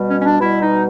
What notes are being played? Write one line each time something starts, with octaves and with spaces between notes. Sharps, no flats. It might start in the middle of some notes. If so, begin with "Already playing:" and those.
Already playing: B2 G3
C#4
C#4
D4
B2 G3 E4
D#4